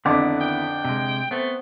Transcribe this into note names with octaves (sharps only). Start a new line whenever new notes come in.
F2 D3 D#3 B3 E4 D6
G5
C3 G#3
A3 B3 C4